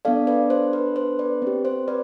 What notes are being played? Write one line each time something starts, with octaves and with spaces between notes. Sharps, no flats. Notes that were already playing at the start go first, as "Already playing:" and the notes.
B3 D4 A4 D5 F5
B4 D5
C5
B4
C5
B4 D5
C4 G4
C5
B4 D5